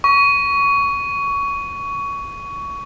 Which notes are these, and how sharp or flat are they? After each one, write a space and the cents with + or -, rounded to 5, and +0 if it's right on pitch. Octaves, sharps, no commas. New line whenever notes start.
C#6 +20